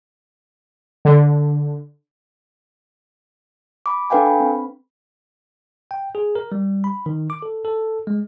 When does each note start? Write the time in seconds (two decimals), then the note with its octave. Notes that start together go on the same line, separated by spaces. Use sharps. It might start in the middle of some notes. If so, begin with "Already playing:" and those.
1.05 D3
3.86 B5 D6
4.10 D4 A4 B4 F5 G5 G#5
4.26 B5
4.40 C4
5.91 G5
6.15 G#4
6.35 A#4
6.52 G3
6.84 B5
7.06 D#3
7.30 D6
7.42 A4
7.65 A4
8.07 G#3